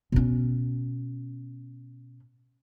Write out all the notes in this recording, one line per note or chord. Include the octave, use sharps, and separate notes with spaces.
B2 C#4